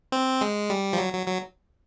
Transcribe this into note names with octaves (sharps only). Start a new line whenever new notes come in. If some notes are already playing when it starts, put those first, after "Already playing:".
C4
G#3
G3
F3
F#3
F#3
F#3